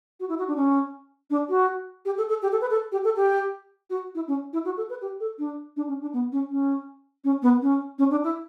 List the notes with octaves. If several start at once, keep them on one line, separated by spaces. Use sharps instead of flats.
F#4
E4
F#4
D4
C#4
D4
F#4
G4
A4
A4
G4
A4
B4
A4
G4
A4
G4
F#4
E4
C#4
E4
F#4
A4
B4
G4
A4
D4
D4
C#4
D4
B3
C#4
C#4
C#4
B3
C#4
C#4
D4
E4